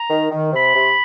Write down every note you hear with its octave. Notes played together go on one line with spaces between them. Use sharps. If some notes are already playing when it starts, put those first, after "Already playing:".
Already playing: A#5
D#3
D#3
C3 B5
C3